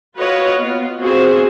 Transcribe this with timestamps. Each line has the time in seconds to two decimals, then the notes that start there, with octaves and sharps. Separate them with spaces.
0.17 F4 F#4 B4 C#5 D#5
0.61 B3 F4
1.00 B3 C4 F4 F#4 G#4 C5